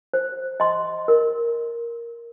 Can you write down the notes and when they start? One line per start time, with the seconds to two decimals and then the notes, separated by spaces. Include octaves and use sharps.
0.14 C5
0.60 D#5 C6
1.08 A#4